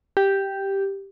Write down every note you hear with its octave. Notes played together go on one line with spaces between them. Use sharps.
G4